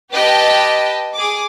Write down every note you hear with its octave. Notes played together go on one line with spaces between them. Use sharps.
G4 B4 D#5 G5 A5
G#4 D6